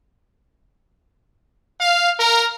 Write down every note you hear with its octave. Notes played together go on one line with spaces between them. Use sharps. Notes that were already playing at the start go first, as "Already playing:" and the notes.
F5
A#4